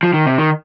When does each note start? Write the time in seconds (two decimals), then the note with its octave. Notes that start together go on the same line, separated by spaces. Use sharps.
0.03 F3
0.14 D#3
0.26 C3
0.38 D#3